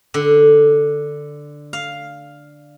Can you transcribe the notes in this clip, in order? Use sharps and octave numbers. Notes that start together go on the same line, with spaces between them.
D3
F5